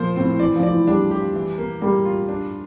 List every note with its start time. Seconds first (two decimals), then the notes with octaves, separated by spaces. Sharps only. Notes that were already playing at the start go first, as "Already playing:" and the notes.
Already playing: A#2 F3 C5
0.16 A2 C4
0.27 A#2
0.40 E3 D5
0.56 F3
0.63 D5
0.71 E3
0.87 G3 D4
1.11 G4
1.34 E3
1.58 A#3
1.81 G3 A#3
2.05 F4
2.29 D4